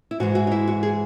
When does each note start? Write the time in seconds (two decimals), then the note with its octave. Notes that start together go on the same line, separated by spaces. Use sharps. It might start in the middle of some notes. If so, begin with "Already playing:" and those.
0.11 E4
0.20 G#2 E3 G#3 F#4
0.35 F#4
0.47 D#4
0.52 E4
0.68 F#4
0.83 G#4